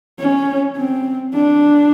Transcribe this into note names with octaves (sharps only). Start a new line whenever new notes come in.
C#4
C4
D4